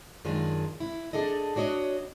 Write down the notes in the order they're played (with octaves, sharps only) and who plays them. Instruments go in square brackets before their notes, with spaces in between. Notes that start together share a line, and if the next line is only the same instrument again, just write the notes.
[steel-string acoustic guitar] F#2 D#3 G#3 D4 F4
E4
D4 G#4 A4 D#5
D4 F#4 C#5 D#5